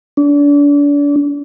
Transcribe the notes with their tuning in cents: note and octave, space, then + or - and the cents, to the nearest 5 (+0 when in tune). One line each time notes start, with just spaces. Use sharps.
D4 -35